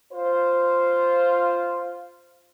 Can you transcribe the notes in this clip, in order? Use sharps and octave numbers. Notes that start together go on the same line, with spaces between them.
F4 C5